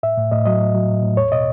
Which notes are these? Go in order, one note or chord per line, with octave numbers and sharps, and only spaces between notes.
A2 E5
A2
A2 D#5
F#3 D#5
A2
F#3
A2
A2
E2 C#5
B2 D#5